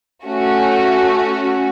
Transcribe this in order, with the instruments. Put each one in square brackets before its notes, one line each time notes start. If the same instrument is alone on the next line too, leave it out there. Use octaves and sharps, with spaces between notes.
[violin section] A3 C#4 F#4